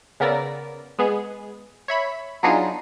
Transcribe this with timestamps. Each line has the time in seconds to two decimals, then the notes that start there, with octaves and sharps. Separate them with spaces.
0.20 C#3 B3 A#4 D5 E6
0.98 G#3 B3 G#4
1.88 C#5 E5 B5
2.43 F#3 B3 D4 D#4 F4 G#4